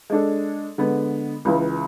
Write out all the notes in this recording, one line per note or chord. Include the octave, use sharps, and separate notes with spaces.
G#3 D4 A4
D3 G#3 B3
C#2 C#3 E3